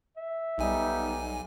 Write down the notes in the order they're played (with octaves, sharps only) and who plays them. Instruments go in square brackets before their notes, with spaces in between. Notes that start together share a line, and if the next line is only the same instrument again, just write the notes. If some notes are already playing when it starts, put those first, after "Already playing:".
[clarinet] E5
[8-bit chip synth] B1 G#5 [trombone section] G3 B3 D#4